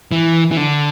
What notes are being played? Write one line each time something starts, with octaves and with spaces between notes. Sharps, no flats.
E3
E3
D3